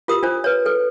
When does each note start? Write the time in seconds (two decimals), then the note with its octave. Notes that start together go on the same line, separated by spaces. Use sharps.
0.08 F4 G4 A#4 D#6
0.23 D4 F4 A#4 C5
0.44 B4 C#5
0.66 A4 B4